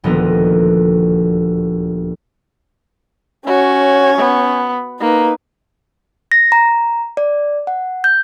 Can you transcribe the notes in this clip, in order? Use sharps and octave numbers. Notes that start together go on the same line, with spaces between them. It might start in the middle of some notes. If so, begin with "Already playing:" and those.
D#1 D2 F3 B3 D#5 A#5
C#4 F#4 C#5
B3
A#3 D#4 B4
A#6
A#5
D5
F#5
G6